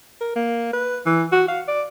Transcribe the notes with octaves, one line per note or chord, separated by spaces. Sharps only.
A#4
A#3
B4
E3
F#4
F5
D5